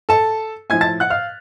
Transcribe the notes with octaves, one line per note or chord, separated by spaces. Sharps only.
A4 A5
A2 F3 G#5 G#6
A5 A6
F#5 F#6
F5 F6